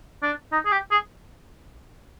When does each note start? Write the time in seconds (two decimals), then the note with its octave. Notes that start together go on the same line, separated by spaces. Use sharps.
0.22 D4
0.52 D#4
0.65 G#4
0.72 G4
0.91 G#4